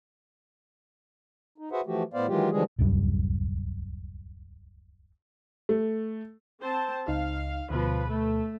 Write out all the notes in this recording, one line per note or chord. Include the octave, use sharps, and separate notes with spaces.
D#4
F#4 G#4 B4 C5 E5 F#5
E3 F3 A3 F#4 G4
A2 B3 C5 D5 F5
D#3 E3 F#3 G#3 F4 G4
D3 E3 F3 G3 G#3 G#4
D1 C2 F#2 G3
A3
C4 C5 A5
C#2 D#4 F5
D2 B2 F3 B4
A3